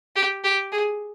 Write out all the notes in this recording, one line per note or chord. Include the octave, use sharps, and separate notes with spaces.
G4
G4
G#4